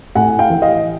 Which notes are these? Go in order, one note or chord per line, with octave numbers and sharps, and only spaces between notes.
A2 F#5 G#5
F5 G5
E3
D#5 F5